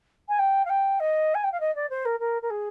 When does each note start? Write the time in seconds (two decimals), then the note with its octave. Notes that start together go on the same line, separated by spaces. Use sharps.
0.28 G#5
0.38 G5
0.65 F5
0.69 G5
0.99 D#5
1.34 G#5
1.43 G5
1.52 F5
1.60 D#5
1.75 D5
1.89 C5
2.05 A#4
2.19 A#4
2.42 A#4
2.50 G#4